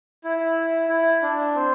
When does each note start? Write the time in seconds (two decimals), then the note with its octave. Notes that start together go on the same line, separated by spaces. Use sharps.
0.24 E4
0.89 E4
1.22 D4
1.55 C4